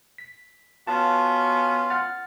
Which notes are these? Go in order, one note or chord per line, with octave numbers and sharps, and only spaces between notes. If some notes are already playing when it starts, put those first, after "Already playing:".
B6
B3 C#4 F4 F#4 F5 A5
F#5 F6 A6